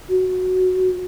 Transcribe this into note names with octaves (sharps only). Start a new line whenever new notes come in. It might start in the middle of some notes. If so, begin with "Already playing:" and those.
F#4